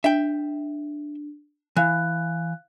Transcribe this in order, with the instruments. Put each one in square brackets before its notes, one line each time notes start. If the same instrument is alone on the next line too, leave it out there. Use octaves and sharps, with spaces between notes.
[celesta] D4 [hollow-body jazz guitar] E5 G5
[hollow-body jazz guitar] E3 [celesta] F5 F#6